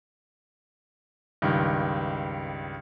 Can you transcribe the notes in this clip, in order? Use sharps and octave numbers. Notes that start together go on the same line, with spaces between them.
C#2 G2 D#3